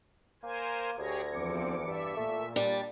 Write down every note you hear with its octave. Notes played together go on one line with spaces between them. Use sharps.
A#3 A#4 C5 G#5
D2 G4 G#4 C#5 G#6 A#6
E2 F3 C4 D6 C#7
G2 D5 E5
A#2 A3
G3 D4 A6